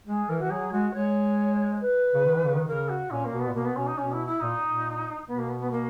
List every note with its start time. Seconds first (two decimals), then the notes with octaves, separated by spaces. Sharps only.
0.07 G#3 G#4
0.29 E3 A#4
0.40 E3 F#4
0.50 F#3 G#4
0.72 G#3 F#4
0.94 G#3 C#5
1.80 B4
2.14 C#3
2.25 D#3
2.35 E3
2.46 C#3
2.56 D#3
2.67 C#3 A#4
2.89 F#4
3.11 A#2 C#4
3.25 A#3
3.32 B2
3.40 B3
3.47 A#2
3.54 B2 A#3
3.65 B3
3.75 B2 C#4
3.87 D#4
3.97 B2 C#4
4.12 E4
4.26 E4
4.40 A#2 D#4
4.66 A#2
5.28 B2 B3
5.38 A#3
5.49 B3
5.60 B3
5.71 A#3